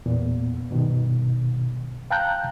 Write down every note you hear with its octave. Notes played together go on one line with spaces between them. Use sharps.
E2 A#2 B3
G2 B2 D#3
F5 G5 A5 A#5 F#6 G6